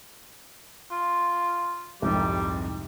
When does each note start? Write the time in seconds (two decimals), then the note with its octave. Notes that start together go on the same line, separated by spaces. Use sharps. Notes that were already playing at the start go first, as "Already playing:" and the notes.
0.91 F4
2.02 C2 F2 G#2 G3